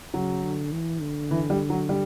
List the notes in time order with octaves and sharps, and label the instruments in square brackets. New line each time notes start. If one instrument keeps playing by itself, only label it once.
[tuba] C#3 [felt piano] F#3
[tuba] D3
E3
D3
[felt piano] E3
G3
F#3
G3